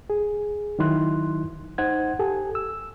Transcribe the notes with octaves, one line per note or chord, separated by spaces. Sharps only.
G#4
D#3 F#3 D#4 E4 C6 F#6
D#4 C5 F#5 G#6
G4 A4 G#5
E6